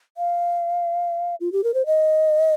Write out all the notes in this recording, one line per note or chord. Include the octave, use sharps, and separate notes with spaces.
F5
F4
G4
A#4
C5
D#5